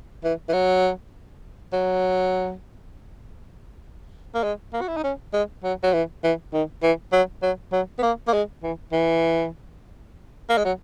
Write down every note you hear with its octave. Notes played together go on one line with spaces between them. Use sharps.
E3
E3
F#3
F#3
A#3
G#3
A#3
F#4
E4
D#4
C#4
G#3
F#3
F#3
E3
E3
D#3
E3
F#3
F#3
F#3
B3
A#3
A#3
G#3
E3
E3
A#3
G#3
F#3